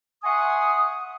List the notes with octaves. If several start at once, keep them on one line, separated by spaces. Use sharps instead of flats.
E5 F#5 G#5 C6 C#6 D#6